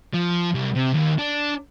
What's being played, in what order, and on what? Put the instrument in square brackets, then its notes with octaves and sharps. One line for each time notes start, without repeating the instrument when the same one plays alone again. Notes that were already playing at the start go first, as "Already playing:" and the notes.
[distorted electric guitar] F3
C2
C3
D#2
D4